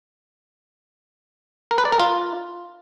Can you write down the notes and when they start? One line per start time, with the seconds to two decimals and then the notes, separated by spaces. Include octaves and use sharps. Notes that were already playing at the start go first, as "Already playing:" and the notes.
1.71 A#4
1.78 B4
1.85 D5
1.92 A#4
2.00 F4